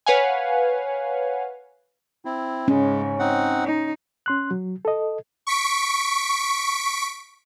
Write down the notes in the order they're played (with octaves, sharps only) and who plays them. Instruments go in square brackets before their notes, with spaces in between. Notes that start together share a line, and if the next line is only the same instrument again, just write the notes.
[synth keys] B4 C#5 F5 F#5 G#5
[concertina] C4 E4
[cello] G#2 C#3 [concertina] G#3 [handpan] C#4
[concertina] C4 D#4 F#5
[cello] D#4
[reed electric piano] C#4 C6 F#6
F#3
A4 D#5
[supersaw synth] C#6 B6 D7